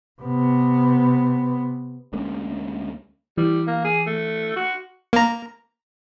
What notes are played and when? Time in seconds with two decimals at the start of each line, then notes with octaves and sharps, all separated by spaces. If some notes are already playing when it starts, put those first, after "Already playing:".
0.21 C3 B3
2.13 D2 G#3 A#3 C#4
3.38 E3 G3
3.67 A#3
3.85 G#4
4.07 A3
4.56 F#4
5.13 A#3 A#5